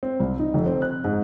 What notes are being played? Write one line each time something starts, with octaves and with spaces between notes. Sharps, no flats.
C4
C2
D#4
F1
C4
F#6
G#2